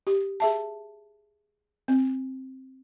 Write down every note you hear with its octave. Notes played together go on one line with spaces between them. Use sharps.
G4
G#4 E5 A5
C4